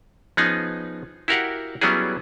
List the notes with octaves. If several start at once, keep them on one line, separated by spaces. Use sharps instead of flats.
F3 B3 C#4 D#4 G#4
E4 F#4 G4 A#4 F5 F#5
F#3 G3 B3 C#4 E4 G#4